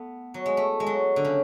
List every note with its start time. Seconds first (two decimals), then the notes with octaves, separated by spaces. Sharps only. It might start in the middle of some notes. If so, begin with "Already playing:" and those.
Already playing: A3 B3
0.34 F#3
0.46 G#3
0.57 A3
0.80 G#3
0.87 F#3
1.16 D3
1.25 C#3